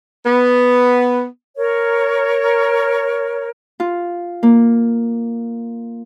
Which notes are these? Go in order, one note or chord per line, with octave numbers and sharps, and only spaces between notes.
B3
A#4 C#5
F4
A#3